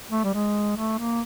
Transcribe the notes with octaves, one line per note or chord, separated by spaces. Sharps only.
A3
G3
G#3
A3
A#3